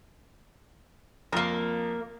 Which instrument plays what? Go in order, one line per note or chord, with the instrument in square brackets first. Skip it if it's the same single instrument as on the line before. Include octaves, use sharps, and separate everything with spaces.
[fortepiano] F2 [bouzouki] A#3 A#4